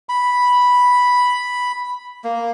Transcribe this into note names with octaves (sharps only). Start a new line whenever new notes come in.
B5
A#3